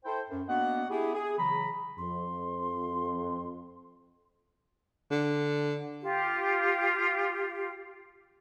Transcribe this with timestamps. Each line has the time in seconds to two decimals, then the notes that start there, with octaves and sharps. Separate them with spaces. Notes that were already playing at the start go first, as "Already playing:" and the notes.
0.05 E4 A4 C5 G5
0.30 F#2
0.48 A#3 B3 D4 F#4 D#5 F#5
0.90 B3 E4 G4 G#4
1.14 G#4
1.38 C#3 E3 F#3 A#5 B5
1.98 F2 C6
5.11 D3
6.01 F4 G4